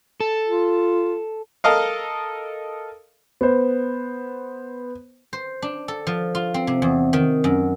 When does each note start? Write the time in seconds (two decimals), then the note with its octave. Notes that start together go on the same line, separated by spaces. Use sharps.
0.20 A4
0.48 F4
1.64 A4 A#4 D#5 F5
3.41 B3 C5
5.33 C5
5.62 D4
5.88 A4
6.07 F3
6.35 F4
6.54 C4
6.67 C3
6.82 E2
7.13 D#3
7.44 F#2